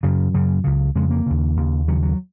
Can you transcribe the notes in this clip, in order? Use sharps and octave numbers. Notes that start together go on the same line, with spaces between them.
F#2 C#3 F#3
F#2 C#3
C#2 C#3
F2 C#3 G#3
A#3
D#2 C#3
D#2 C#3
D#2 C#3 F#3
F#3